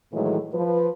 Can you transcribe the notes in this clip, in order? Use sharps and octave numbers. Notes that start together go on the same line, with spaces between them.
A2 D#3 E3 F#3 G#3 A3
F3 B4